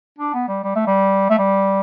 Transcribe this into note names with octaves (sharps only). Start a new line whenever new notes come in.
D4
B3
G3
G3
A3
G3
A3
G3